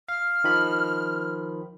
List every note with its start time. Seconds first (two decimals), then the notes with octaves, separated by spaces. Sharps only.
0.09 F5 F6
0.44 D#3 F3 B5